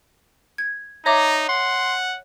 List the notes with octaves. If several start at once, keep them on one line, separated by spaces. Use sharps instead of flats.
G#6
D#4 C#5 E5 A#5 D6
F#5 C6